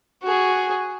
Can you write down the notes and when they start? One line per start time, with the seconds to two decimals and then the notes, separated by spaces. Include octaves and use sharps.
0.23 F#4 G#4